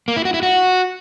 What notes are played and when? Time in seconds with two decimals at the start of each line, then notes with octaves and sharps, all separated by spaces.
0.08 A#3
0.17 E4
0.25 F#4
0.34 E4
0.43 F#4